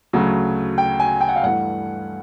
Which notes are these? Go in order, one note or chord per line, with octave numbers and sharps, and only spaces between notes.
D2 C#3 F#3 A3
G5
G#5
G5
F#5
F5
G2 E3 A3 F#5